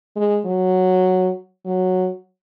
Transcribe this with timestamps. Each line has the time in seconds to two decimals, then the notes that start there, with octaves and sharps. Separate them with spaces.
0.16 G#3
0.45 F#3
1.65 F#3